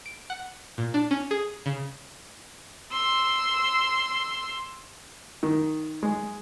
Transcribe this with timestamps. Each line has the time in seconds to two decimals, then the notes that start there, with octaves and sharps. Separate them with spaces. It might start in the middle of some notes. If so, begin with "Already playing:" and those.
0.06 D7
0.30 F#5
0.78 A#2
0.94 D4
1.11 C#4
1.31 G#4
1.66 C#3
2.92 C6 E6
5.43 D#3
6.03 G#3